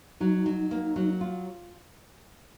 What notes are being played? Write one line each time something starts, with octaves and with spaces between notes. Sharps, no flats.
F#3 D#4
F#3
A#3
F#3
F4